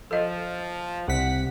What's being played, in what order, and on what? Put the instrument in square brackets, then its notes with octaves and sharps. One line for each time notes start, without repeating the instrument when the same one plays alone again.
[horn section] F3 [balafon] A4 D#5
[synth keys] C2 B6 [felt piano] C3 [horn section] F#5